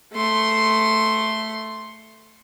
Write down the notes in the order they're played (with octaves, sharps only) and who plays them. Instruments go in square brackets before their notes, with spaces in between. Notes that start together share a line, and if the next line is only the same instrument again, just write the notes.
[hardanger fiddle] A3 C6